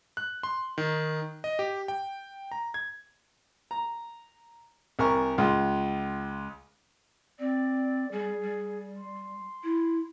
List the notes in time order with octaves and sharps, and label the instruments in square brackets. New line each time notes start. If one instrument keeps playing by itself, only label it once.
[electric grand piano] F#6
C6
D#3
D#5
G4
G5
A#5
G#6
[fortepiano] A#5
C2 A#4 G#5 C#6
C#2 F4
[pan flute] C4 [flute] D5
[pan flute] G3 [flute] G#4
[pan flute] G3
[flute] C6
[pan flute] E4